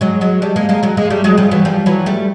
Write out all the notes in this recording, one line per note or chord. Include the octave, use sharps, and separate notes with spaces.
F#3 G#3
F#3 G#3
G3 A3
G#3 A#3
G#3 A#3
F#3 G#3
G#3 A#3
G3 A3
F#3 G#3
F3 G3
E3 F#3
F3 G3
E3 F#3
G3 A3